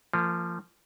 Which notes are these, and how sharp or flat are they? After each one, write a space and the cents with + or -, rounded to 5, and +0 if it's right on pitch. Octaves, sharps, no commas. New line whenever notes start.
F3 -15 A#3 -40